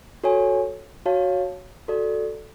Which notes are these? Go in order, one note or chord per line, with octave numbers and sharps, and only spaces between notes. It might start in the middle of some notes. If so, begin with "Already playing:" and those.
F#4 A4 C#5 G#5
F#4 C#5 F5 A5
F#4 A4 D5